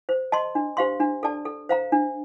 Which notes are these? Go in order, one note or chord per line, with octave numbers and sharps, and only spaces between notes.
C5
D#5 A5 C6
D4
G4 C5 F5 C6
D4
A4 D5 A5
A4
C5 F5 A#5
D4